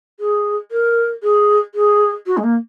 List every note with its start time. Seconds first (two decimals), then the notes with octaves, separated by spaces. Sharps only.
0.19 G#4
0.71 A#4
1.22 G#4
1.74 G#4
2.26 F#4
2.37 G#3
2.43 A#3